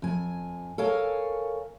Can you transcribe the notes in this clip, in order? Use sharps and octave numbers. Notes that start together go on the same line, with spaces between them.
F2 G#5
A4 A#4 C#5 F5 G#5